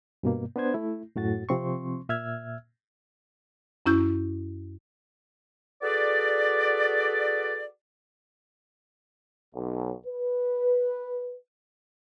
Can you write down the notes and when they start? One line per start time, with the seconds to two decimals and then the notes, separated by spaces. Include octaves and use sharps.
0.23 G2 B2 A#3
0.56 B3 D4 B4 C5 G#6
0.74 A3 E4
1.16 F#2 A2 F#4 A6
1.49 C3 F3 C4 C6 C#6
2.09 A#2 E5 E6 F6 G#6
3.86 F#2 C#4 E4 G6
5.82 F#4 G#4 A4 B4 D5
9.55 B1
10.06 B4